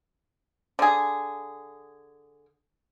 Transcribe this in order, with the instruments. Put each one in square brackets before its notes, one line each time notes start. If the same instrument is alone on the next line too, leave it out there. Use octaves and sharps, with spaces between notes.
[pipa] D3 G#4